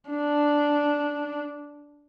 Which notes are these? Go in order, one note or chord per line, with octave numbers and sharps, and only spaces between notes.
D4